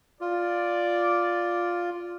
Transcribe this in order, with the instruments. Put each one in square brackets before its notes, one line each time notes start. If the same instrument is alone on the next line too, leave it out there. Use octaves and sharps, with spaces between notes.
[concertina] F4 [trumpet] D5